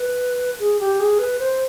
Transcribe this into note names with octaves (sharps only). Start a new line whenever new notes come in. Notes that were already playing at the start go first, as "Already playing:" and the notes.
Already playing: B4
G#4
G4
G#4
B4
C5